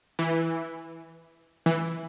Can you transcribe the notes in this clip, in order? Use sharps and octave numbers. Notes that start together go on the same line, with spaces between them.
E3
E3